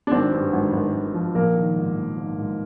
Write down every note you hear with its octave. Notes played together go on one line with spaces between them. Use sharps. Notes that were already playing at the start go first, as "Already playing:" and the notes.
D4
G#1 C4
G2
G#1
G#1
G#1
F3
A#1 A#3
D#3
G#2
A#1
G#2
G#2